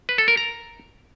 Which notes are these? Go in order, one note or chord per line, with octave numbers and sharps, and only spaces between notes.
B4
A4
A#4
A#5